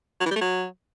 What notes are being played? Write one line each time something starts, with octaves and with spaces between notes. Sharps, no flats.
F#3
E3
G3
A3
F#3